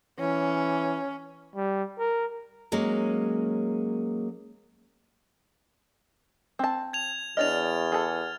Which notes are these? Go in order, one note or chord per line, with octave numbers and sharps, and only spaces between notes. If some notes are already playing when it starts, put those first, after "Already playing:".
E3 C#4
G3
A#4
F#3 G#3 A#3 C#4
C4 A5
G#6 F7
E2 D4 C#5 D#5 F6 A6 F7
G#4 A4